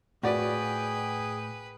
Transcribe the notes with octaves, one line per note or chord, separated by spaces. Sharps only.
A2 F#4 G#4 B4 D5 G5